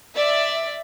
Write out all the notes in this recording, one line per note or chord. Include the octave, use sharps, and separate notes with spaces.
D5 E5